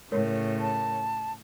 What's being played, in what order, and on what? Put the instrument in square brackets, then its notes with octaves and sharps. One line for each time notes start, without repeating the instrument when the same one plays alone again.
[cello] A2 C#3 [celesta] A#4 C#5
[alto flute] A5